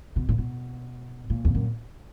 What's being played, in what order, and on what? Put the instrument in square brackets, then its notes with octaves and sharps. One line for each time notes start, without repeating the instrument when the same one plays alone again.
[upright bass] B2
A#2
B2
A#2
E2
F#2